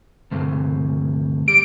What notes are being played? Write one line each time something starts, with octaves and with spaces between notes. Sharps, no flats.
D2 G2 C3
G3 D7